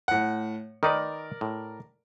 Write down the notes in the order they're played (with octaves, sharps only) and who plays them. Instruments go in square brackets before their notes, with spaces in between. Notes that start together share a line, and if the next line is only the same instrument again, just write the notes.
[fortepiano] A2 F#5
[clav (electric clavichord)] D#3 D#4 B4 [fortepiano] A#4 D5
[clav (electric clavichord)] A2